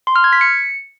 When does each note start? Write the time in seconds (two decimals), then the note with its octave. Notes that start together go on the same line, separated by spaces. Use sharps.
0.07 C6
0.16 F6
0.24 G#6
0.33 B6
0.41 C#7